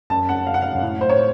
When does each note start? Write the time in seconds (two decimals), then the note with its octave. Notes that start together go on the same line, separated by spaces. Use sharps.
0.10 F#2 A5
0.29 F#5
0.47 F5
0.54 F#5
0.62 F5
0.75 F#2
0.83 A2
1.01 C5
1.09 C#5